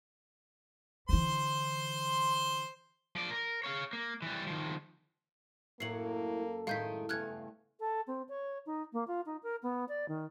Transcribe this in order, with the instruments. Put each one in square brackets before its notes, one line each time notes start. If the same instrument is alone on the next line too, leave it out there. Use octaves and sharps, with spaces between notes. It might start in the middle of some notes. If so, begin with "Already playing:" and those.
[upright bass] D3 E3 [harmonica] C5 C6
[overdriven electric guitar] F3 D5
A#4
C#5 F5
A#3
E3 G3
D#3 F3
[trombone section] F#2 A4 [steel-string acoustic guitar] A2 F#3 [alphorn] A#3 [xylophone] C7 F#7
[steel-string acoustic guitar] A2 D#3 G#3 [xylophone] F5 G6 B6
[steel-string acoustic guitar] E2 G2 C#3 [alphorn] A3 [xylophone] F6 F#6 G#6
[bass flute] A4
C4
C#5
D#4
A#3
F4
D#4
A#4
B3
D5
D#3